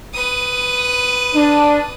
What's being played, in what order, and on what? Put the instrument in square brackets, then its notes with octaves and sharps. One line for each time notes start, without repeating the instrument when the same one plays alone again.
[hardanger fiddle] B4 D#6
[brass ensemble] D4